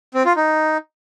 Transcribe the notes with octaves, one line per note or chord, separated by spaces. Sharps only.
C4
F4
D#4